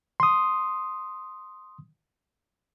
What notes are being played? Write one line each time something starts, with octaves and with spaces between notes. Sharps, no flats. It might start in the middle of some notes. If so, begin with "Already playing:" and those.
C6 D#6